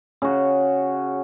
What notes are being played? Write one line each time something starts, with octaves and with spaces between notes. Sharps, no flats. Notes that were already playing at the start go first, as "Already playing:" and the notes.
C#3 F#4